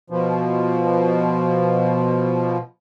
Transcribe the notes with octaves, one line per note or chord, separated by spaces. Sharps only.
B2 F3